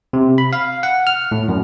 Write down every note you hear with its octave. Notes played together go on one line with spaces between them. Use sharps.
C3
B5
F5
F#5
F6
A2
F#2